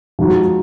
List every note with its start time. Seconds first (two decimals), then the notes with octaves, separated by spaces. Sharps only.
0.19 F3 G#3 D#4 F#4